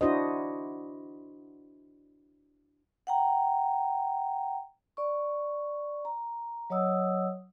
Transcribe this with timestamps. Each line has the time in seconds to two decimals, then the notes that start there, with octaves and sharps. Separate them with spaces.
0.01 D4 E4 F#4 C5 D#5
3.07 F#5 G5 A#5
4.97 D5 C#6
6.05 A#5
6.70 F#3 C#5 D#5 F#5 D#6 E6